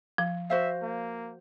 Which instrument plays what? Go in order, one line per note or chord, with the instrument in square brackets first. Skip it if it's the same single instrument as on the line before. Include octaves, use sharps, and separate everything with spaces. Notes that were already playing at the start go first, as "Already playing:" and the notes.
[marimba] F3
[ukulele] F#4 C5 F5 [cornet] E5
[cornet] A#3